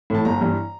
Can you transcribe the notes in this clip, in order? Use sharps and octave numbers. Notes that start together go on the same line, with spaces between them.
A2 E3 A5
G1 A#5
G2 E3